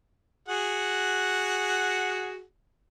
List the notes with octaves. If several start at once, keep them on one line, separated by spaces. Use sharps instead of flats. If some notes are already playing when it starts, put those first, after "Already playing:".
F#4 G#4 F#5